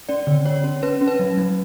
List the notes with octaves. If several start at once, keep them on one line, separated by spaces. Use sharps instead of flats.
C#4 D5
D3
D3 C#5
C#4
C#4 B4
C#4
B4
F#3
F#3